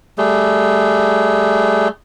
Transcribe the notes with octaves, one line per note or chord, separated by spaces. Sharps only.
G3 A3 G#4